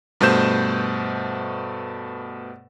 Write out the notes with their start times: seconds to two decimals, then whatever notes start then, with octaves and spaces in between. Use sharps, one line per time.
0.21 G2 B2 A3 C5 G6 E7